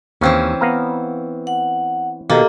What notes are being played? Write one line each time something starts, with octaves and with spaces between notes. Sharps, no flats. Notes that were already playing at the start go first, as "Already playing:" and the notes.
D#2 E3 C4 C#4 F5
B3 F5 A#5
F#5
B2 D#3 A#3 G4 A4 D#5